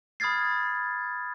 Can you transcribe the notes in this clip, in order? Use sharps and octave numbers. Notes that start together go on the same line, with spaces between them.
B5 D#6 F6 G#6 A6 C7